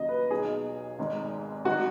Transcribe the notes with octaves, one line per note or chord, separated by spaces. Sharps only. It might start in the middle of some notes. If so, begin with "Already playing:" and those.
Already playing: D#2 C#3 F#3 D#5
B4
B1 B2 F#3 G#4
G#1 G#2 D#3
G#1 D#3 F#3 F#4